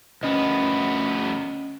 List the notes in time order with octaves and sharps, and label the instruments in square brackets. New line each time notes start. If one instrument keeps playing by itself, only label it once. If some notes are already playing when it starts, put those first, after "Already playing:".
[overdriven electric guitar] D2 B3 [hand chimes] C#4 D#5